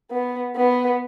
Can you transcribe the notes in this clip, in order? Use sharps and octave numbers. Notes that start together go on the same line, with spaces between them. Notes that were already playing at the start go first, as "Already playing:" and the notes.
B3
B3